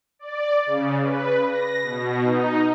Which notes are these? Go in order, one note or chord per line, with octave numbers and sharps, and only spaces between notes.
D5
C#3
B4
A#6
B2
D#4